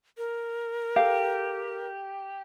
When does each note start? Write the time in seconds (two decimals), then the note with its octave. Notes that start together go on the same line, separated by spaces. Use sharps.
0.18 A#4
0.96 G4 A4 F5